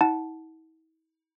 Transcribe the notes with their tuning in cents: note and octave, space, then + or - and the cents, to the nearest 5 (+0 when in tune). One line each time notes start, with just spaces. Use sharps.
E4 -45 F#5 +0 A5 -15